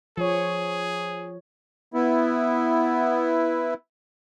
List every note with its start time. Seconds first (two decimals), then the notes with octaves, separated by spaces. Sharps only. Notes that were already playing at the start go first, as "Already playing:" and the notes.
0.17 F3 G#4 C#5
1.94 B3 E4